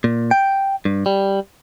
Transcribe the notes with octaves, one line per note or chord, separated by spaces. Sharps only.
A#2
G5
G2
G3